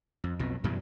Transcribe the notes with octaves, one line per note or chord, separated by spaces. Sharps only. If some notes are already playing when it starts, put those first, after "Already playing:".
F2
B1 F2 B2
F#2 B2 E3 G3